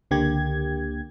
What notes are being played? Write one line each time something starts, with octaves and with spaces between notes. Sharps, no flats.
C#2 D3 A#3 G4 G#6